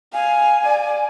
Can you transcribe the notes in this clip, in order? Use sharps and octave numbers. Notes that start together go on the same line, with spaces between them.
F5 G#5
D5